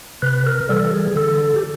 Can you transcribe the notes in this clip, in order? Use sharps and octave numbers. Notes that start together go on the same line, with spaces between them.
C3 B4
A#4
E3 G3 A4
G#4
D3 A4
G4